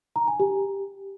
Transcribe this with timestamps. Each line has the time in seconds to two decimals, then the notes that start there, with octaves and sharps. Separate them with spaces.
0.16 A#5
0.28 G#5
0.40 G4